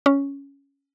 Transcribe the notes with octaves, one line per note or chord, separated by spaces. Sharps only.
C#4